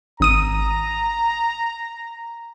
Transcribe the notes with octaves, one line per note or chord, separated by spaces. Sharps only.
G#1 A#5 D#6 D#7